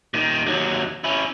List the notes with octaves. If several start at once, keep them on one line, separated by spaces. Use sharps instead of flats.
A#2 D#3
D#2 F#3
C#4 E4